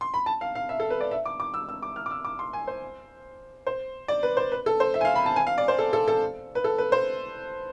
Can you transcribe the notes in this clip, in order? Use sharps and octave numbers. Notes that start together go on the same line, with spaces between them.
C6
B5
A5
F5
F5
E5
A4
B4
D5
E5
D6
D6
E6
E6
D6
F6
D6
E6
D6
C6
G#5
C5
C5
D5
B4
C5
B4
A4
C5
E5
G#5
F5
B5
A5
G#5
F5
D5
C5
A4
A4
A4
B4
A4
B4
C5